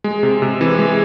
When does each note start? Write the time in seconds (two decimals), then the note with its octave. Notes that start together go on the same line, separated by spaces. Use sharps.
0.04 G#3
0.23 C3
0.42 C3
0.61 E3
0.79 G#3